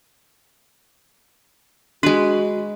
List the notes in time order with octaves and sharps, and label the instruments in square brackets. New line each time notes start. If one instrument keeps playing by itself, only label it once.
[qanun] G#3 B4 [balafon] D4 [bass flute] F#4